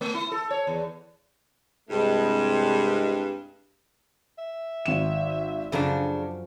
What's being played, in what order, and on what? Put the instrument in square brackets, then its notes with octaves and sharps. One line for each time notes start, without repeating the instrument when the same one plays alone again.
[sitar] A3
E4
A4
C#5
E2
[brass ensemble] C2 G#3 [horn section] G2
[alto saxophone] E5
[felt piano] G#1 E7
[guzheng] F#2 F3 [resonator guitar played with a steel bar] C#3 D4 [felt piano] A4